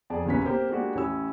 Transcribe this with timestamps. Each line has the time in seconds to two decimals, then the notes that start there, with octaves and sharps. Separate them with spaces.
0.10 F2 G#4 D5 A5
0.26 F#1 C2 A#2 C#4 B4 B6
0.45 A#3 C4 G4 A#4 C5
0.70 G#3 A#3 D4 F#4 G4
0.95 A1 C#4 E4 E6